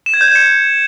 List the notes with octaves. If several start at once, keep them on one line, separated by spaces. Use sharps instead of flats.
E7
G#6
G6
E7
C#7